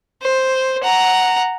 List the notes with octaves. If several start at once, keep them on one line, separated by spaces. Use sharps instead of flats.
C5
F#5 A#5